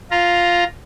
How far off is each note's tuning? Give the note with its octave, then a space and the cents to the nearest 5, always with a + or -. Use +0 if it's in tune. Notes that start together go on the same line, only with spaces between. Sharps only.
F4 +0 A#5 +5